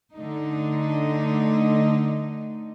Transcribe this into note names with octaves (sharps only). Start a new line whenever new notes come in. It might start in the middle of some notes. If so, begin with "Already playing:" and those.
D3 A3 D#4